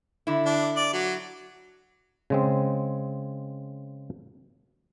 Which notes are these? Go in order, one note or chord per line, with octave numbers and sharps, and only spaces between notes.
D3 E4
D4
D5
F#3
C#3 G#3 C4